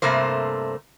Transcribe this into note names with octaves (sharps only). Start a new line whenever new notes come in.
G2 C3 A3 A#3 C5